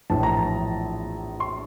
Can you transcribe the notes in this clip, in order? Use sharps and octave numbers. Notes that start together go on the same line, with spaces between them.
A#1 A2 E3 A5
A#5
A5
C6